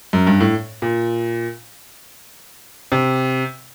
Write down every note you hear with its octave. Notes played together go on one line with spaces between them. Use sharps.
F#2
G2
A2
A#2
C3